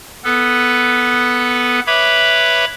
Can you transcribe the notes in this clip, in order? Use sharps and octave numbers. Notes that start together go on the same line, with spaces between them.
B3 A4 B4
B4 C#5 E5 B5 D6